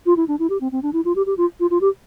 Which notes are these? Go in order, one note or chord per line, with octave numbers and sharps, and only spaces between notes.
F4
E4
D4
E4
G4
C4
C4
D4
E4
F4
G4
G4
F4
F4
F4
G4